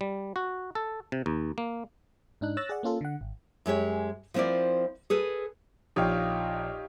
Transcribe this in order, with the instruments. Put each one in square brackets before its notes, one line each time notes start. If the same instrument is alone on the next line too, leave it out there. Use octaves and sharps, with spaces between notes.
[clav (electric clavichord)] G3
F#4
A4
C3
D#2
A#3
[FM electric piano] G#2 D4 D#4 F#6
C#5 E6 F#6 A6 A#6
G#4 D5 F#5
A#3 C#4 F4 A4
D3 F#5
G#1
[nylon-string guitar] F#2 G#3 G4 C#5
F3 B3 C4 E4 A#4 D5
G#4 A4 B4
[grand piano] A#1 [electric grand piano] D#4 G4 C#5 [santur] D#5 F5 G5